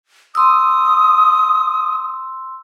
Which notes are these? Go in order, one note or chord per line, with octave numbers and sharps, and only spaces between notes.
C6 D#6 E6